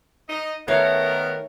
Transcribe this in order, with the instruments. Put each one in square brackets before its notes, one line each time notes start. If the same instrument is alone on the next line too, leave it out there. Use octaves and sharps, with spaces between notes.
[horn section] D#4 D#5
[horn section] D#3 B3 A#4 [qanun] A3 C#5 F5